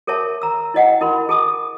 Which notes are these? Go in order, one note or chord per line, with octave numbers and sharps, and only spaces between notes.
G#4 A#4 C#5 E5 A5
A#5 E6
E4 C#5 D#5 F#5 G5
E4 A#4 B5 C6
G#4 A5 D#6